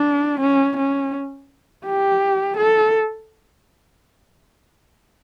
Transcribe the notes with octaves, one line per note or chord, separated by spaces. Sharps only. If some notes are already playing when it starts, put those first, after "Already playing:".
Already playing: D4
C#4
C#4
G4
A4